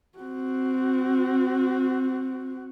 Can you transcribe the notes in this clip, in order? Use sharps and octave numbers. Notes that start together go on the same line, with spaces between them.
C4 F#4